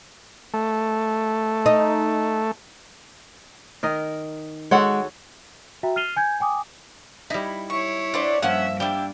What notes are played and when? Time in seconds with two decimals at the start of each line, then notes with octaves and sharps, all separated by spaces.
0.54 A3
1.66 D#4
3.83 D#3 A#4 D#5
4.71 G#3 F#4 A4 C#5 F#5
5.83 F#4 E5 G5 A#5
5.96 F6 A6 C7 D#7 F7 G7
6.16 G#5 G6 G#6
6.40 G5 G#5 D6 D#6
7.30 G3 D#4 E4
7.70 E4 C#5 C#6
8.14 D4 C5 D5 F#5
8.42 G2 F3 A#3 C#4 E5 F#5
8.80 G3 D4 E4 G4